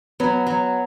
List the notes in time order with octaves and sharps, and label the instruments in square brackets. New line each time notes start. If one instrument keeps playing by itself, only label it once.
[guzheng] F#3 [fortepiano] B3
[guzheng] F#3